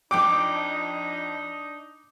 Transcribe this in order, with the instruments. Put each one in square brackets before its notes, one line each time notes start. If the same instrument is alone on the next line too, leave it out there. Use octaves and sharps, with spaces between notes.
[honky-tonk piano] F2 G5 D7 [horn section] D4 D#4 [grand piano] D6